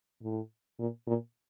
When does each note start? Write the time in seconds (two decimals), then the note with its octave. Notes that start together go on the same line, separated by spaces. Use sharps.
0.23 A2
0.79 A#2
1.07 A#2